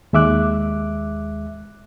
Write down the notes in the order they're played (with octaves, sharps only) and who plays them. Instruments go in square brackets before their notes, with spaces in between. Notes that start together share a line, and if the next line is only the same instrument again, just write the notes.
[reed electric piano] D#2 G#3 E5 D6 F#6